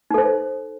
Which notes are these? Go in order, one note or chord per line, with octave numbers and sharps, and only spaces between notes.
D#4 A4 C5